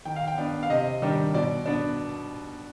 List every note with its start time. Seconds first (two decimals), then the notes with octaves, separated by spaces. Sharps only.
0.05 D#3 G5
0.16 F5
0.28 G5
0.38 B3 D4
0.63 F5
0.70 C3 D#5
1.02 D#3 G3 D4
1.34 B2 D5
1.66 B3 D4